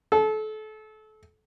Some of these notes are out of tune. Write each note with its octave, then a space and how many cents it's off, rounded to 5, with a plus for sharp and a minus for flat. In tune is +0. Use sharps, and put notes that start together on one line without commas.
A4 -30